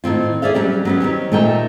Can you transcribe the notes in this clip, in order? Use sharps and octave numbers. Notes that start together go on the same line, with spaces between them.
A2 D#3 C4 F4
G#4 C5 D5 E5 F5
F#3 G3 A3 C#4 G4
F#3 B3 C#4
D#3 C4 G4 C#5
A#2 D#3 A3 D#4 A#4 G5